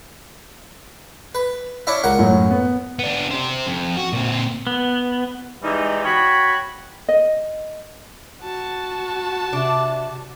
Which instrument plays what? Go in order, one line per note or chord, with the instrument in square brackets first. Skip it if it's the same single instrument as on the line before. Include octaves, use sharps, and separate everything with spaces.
[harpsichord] B4
C#4 D4 E4
[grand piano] C#2 [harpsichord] A#4 F#5
[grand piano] F#2 A2
B3
[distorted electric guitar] B3 D4
G4 C5
F2
F#4
A#2 C4
[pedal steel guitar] B3
[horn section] E3 G3 G#3 D#4
F#4 C#5 G5 B5
[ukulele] D#5
[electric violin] F#4 A5
[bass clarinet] C3 [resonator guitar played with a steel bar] D4 D5